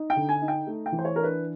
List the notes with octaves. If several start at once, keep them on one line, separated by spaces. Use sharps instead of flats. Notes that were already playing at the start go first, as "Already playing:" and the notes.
Already playing: D#4
G5
D3
G#5
D#4
G5
A3
G5
E3
C5
C#5
D4 A#4
B4